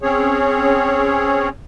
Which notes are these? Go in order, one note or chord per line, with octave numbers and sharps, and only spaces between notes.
C4 C#4 G#4 C#5